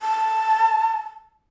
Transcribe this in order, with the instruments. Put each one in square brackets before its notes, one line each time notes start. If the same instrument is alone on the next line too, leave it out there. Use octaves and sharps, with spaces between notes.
[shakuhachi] A5